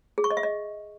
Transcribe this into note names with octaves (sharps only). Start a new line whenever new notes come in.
G#4
C#6
D#5
E5
D#5